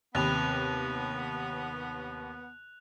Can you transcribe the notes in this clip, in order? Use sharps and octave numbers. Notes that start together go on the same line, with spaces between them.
D#2 C3 B3 G5 B5 F#6 F7